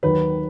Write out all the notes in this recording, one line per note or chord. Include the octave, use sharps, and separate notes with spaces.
D#2 D#3 F#3 B4